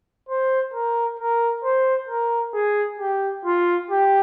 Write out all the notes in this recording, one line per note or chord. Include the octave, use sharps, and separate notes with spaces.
C5
A#4
A#4
C5
A#4
G#4
G4
F4
G4